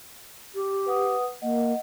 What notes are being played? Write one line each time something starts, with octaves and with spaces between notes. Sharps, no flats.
G4
B4 F#5 D#6
A#3 D#5 F#5